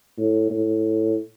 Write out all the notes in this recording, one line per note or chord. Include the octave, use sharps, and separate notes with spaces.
A2
A2